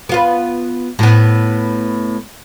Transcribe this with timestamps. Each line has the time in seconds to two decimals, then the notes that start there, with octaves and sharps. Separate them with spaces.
0.09 B3 F4 B4
0.99 A2 B3